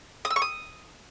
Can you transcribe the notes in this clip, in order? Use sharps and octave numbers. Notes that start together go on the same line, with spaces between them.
D#6
E6
C#6
D#6